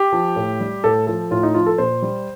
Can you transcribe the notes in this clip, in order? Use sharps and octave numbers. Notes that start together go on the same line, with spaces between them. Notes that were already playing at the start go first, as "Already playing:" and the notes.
Already playing: G4
F3
A2
G3
A2 A4
F3 A4
A2 F4
D#4
F3 F4
A4
A#2 C5
G3